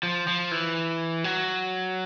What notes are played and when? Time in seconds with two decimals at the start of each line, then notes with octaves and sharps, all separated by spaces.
0.03 F3
0.27 F3
0.51 E3
1.24 F#3